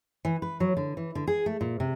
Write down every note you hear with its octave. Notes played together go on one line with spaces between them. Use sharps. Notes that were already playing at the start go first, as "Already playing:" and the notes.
E3
B4
F#3
D3
E3
D3
G#4
A3
A#2
C3